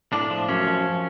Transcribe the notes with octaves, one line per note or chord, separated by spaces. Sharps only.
A2 D4
F3
F#2 C#4
F3